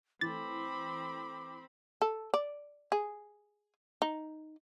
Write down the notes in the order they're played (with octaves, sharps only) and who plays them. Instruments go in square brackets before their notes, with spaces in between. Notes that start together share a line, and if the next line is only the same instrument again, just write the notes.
[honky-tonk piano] E3 A3 [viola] C4 B5 [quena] D6 [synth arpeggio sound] A6
[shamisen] A4
D5
G#4
D#4